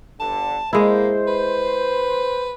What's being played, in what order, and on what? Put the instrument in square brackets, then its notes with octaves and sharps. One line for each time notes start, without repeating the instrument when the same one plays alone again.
[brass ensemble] G1 D3 [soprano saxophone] A5
[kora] G#3 E4 [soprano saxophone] A#3 [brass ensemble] C5
[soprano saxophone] B4